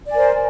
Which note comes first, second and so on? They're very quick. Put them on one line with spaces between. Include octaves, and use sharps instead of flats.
D5 G#5 A#4 C5